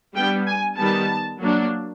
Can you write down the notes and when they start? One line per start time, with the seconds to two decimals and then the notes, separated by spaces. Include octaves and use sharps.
0.15 G3 B3 D4 G5
0.47 G#5
0.78 D#3 G3 B3 A5
1.41 F#3 A#3 D4